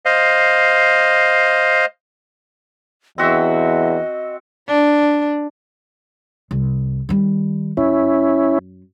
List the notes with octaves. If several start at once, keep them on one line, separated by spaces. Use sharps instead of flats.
C5 D#5 F5
E2 C4 F#4 D#5 E5
D4
C2
D#3 G3
F#2 C#4 E4